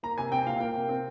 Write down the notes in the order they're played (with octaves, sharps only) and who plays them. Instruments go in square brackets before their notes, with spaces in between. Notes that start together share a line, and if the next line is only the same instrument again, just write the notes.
[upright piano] A#3 A#5
C3 G#5
C4 G5
A#2 F5
A#3 G5
C3
C4